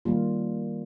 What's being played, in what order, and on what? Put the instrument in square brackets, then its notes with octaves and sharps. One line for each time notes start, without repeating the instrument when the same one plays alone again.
[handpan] D#3 G3 A#3 F4